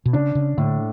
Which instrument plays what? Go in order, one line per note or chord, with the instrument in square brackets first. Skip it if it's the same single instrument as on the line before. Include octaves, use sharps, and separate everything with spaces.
[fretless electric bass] B2
[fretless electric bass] C#3 [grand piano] D4
[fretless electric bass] C#3
[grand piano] A2 [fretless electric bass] D3